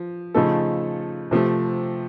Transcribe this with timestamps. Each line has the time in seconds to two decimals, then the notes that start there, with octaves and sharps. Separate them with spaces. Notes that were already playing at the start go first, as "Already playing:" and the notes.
Already playing: F3
0.34 C#3 F3 A3 D#4 A4
1.31 C3 F3 A3